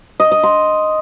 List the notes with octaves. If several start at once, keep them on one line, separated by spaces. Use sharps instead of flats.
D#5
D#5
C6